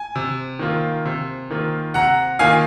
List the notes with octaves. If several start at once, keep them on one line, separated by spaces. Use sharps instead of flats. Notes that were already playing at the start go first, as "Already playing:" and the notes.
Already playing: G#5
C3
D#3 A#3 F4
C3
D#3 A#3 F4
C3 F#5 A#5
D#3 A#3 F4 F5 G#5